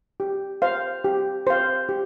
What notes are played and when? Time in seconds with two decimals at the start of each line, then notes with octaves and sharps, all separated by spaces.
0.20 G4
0.62 C5 F5
1.04 G4
1.47 C5 F5
1.89 G4